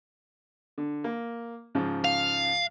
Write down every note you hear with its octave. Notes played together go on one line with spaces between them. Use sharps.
D3
A#3
G#2 C#3 F3
F5